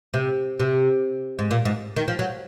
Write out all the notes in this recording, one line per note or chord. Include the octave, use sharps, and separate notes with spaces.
C3
C3
G#2
A#2
G#2
D#3
F3
F#3